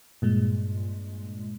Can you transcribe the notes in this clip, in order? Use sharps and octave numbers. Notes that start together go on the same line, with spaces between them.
G2 A#2 G#3